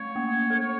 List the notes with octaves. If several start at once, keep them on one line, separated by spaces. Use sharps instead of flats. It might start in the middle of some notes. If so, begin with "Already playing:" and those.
Already playing: A3 C#5
A#3
A4